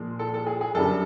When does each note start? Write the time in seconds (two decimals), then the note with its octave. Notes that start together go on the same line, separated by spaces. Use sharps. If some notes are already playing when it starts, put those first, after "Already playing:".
Already playing: A#2 F3 G#3
0.19 A4
0.34 A4
0.47 G#4
0.61 G#4
0.75 F#2 D3 G3 A4